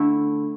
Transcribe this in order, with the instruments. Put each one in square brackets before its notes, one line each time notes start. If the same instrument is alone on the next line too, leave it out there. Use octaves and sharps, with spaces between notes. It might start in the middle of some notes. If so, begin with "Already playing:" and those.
Already playing: [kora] D3 A3 E4